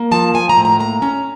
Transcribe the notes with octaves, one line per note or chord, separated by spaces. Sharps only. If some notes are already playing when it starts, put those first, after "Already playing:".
Already playing: A#3
F3 A5
F3 G#5
A#5
A2
A#5
A#3 A#5
C#4 A#5